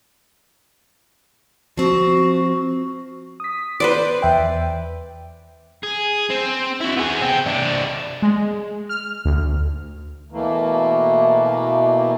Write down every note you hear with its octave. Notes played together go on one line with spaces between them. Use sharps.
F3 C4 F#4
D#6 B6
B4 C5 D5 D6
E2 E5 G5
G#4
C4
E4 F#4
B3 G#4
C4 G4
C3 D4
G#3
F6
D2
B2 E3 A3 A#3